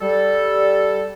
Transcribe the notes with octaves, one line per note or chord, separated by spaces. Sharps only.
G3 A4